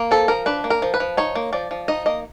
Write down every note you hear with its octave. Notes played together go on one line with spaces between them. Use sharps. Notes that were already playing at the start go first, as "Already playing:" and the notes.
Already playing: A#3
F3 A4
F3 A#4
D4 B4
A#3
A#4
F3
B4
F3
D#4 C#5
A#3
F3 D5
F3
D#4 D#5
A#3 D#5